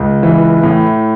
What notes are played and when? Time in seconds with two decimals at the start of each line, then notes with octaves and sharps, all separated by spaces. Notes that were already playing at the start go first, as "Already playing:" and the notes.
Already playing: C#2
0.23 E3
0.63 A2